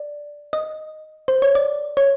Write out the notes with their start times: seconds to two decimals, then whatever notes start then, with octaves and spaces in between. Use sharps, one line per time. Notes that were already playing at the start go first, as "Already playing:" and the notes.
Already playing: D5
0.53 D#5
1.28 C5
1.42 C#5
1.55 D5
1.97 C#5